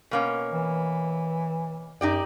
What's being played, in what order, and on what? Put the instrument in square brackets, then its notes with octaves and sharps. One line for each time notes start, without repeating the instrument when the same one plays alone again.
[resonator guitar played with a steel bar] B2 A#3 C#4
[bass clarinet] E3
[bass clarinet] F#2 [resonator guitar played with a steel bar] D#4 G4 D5